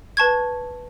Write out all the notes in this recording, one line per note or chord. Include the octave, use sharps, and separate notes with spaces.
B4 A5 C#6 G#6